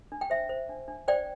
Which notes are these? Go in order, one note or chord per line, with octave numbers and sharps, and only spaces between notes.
D4
G5
C5 E5
C5
D4
D4
C5 D5 G5